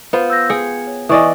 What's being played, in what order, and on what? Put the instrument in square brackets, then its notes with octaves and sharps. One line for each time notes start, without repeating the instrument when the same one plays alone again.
[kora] B3 F4 C5
[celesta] E6 G6 A#6
[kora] G#4 G5 [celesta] C#7
[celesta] C#5
[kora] E3 D5 D#5 [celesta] G#5 C#6 D#6